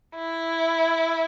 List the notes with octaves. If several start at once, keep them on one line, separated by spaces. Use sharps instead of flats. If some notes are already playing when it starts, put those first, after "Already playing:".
E4